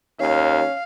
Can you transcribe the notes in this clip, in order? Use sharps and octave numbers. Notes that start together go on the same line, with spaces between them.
D#2 C#4 F5